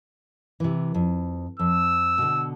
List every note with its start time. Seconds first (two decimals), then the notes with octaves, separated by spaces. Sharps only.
0.60 C3 E3
0.94 F2
1.59 F2 E6
2.18 B2 D3